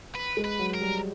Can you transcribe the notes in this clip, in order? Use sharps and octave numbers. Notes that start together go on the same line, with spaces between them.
B4
G#3
B4
F#3
A#4
G3